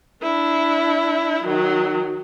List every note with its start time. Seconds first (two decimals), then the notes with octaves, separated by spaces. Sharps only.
0.22 D4 E4
1.43 D#3 F#3